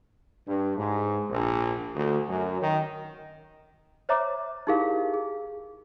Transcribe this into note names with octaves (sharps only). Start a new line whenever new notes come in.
G2
G#2
A#1
D2
F#2
D#3
C5 C#5 E5 A#5 D6
D#4 E4 G4 G#4 A#4 F5
G#4